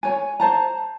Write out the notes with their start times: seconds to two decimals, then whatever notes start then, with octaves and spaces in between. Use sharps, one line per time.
0.03 C#5 G#5
0.40 C5 A5 A#5